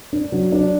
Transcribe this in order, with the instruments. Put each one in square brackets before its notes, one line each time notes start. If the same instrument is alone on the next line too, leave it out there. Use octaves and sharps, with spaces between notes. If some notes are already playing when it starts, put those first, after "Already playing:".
[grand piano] D4
F#3
D4